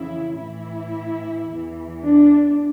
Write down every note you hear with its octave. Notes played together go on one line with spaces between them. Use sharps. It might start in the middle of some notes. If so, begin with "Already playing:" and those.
Already playing: F2 C#3 E3 E4
A2 E3 E4
E2 E3
D4